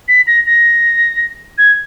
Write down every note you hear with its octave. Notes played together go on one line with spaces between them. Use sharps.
B6
A#6
A#6
G#6